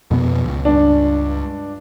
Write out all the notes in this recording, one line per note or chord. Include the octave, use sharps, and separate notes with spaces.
F2 B2 B3
C#2
G2 D4